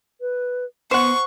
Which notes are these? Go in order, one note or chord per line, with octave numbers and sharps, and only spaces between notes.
B4
B3 C5 F#5 C#6